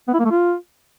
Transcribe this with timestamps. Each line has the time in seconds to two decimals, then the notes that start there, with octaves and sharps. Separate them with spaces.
0.08 B3
0.14 E4
0.19 A#3
0.25 A3
0.31 F4